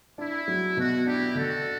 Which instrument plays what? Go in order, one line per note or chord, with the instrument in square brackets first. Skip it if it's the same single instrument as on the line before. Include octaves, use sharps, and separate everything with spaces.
[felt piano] D4 [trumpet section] E4
[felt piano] F#3
[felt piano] B2 [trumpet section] F#4
[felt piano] D4 [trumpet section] E4 G4
[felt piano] D3 [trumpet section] F#4 A4